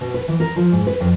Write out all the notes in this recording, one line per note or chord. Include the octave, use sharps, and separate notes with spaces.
B2
B4
E3
A#4
F3
G#2
B4
F2